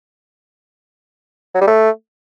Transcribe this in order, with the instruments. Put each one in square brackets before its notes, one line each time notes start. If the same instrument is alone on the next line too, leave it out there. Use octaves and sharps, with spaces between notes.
[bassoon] F#3
G3
A3